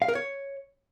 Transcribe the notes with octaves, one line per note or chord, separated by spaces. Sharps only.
F5
A#4
C#5